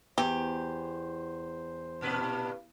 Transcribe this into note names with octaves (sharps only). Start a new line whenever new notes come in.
E2 G4 C5
G2 A#2 B4